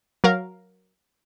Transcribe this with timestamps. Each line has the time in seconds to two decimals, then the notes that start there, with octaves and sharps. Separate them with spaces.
0.24 F#3 A#4 F5